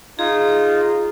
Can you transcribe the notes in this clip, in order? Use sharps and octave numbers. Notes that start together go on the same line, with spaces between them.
D#4 F4 G#4